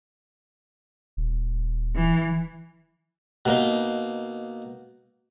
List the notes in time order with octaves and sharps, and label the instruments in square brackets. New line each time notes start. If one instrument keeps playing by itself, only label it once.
[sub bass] D#1
[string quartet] E3
[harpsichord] B2 A#3 D#4